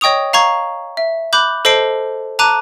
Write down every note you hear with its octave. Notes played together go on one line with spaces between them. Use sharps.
C#5 D#5 G5 C#6 D#6 F7
F5 A#5 C#6 G#6
E5
B5 D6 F#6 G6
A4 C5 D#5 A5 C7 D7
A5 A#5 D6 F#6 D#7